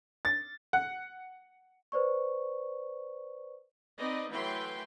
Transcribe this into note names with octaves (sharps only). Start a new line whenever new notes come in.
A6
F#5
B4 C5 D5 C#6
C4 D#4 B4 D5 D#5
E3 F#3 A3 B4 G5 C6